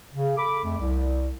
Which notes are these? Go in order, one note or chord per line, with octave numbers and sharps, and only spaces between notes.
C#3
A4 B5 D6
F2 A3
C2